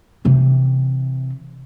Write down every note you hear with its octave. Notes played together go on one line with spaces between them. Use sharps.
C3 E3